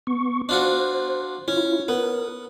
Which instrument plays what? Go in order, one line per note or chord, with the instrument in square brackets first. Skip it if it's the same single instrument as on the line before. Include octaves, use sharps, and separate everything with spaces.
[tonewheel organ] B3 C#6
[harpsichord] D4 F4 F#4 [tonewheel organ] C5
[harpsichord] C#4 [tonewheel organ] E4 F4
[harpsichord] B3 [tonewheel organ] A#4